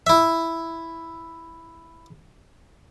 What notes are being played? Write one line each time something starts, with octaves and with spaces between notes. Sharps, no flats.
E4 E5